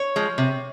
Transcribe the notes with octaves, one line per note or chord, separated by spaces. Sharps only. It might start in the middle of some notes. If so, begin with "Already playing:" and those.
Already playing: C#5
F3 G#3
C3